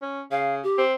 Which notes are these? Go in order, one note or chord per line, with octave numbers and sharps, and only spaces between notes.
C#4
C#3 F5
G4
C4